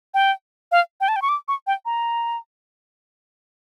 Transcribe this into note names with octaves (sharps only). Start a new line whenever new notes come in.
G5
F5
G5
A5
G5
C#6
D6
C#6
G5
A#5